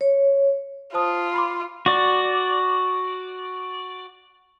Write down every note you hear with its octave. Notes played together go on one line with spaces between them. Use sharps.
C#5
F4 C5 A5 D#6
B5 C6 D6
F#4 D5